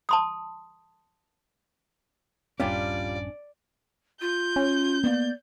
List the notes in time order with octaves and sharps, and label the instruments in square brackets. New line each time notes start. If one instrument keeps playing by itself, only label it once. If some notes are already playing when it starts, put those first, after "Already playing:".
[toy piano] A5 C6 D#6
[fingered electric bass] D#1 A#1 G2 [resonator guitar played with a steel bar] G3 F4 [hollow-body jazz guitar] C#4 D4 [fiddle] D5
[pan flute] F4 [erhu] G6
[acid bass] C#4
[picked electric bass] A#3 B3 [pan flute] D5